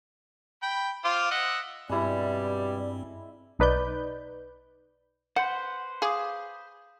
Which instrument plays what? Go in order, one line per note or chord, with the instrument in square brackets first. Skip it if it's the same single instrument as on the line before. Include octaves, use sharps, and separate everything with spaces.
[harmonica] G5 B5
F4 C5 D6
D#5 E5 F#5
[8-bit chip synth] G2 C4 [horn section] B2 G3 [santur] G#3 E4 [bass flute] D5
[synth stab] B1 D#4 B4 D5 G6
[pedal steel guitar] B4 C5 [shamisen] F#5
[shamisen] G#4 [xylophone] F5 D6 D#6